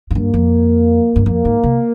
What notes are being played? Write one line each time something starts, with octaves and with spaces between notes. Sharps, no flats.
G#2
G2 A#3
F2
G2
F2 A#3
G#2
C3